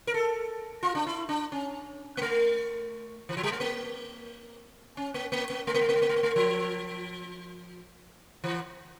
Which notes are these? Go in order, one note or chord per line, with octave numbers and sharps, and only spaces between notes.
A#4
A4
F4
D4
E4
D4
C#4
A#3
A3
E3
F3
G3
A3
A#3
C#4
A#3
A#3
A#3
A3
A#3
A3
A#3
A3
A#3
A3
A#3
A3
F3
E3